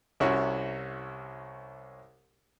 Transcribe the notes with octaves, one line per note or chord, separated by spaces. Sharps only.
C2 C3 C#4 E4 F#4